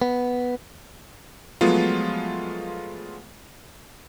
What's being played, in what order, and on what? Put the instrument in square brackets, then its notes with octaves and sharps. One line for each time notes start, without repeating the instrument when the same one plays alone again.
[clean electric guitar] B3
[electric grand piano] F3 F#3 G#3 A3 B3 F4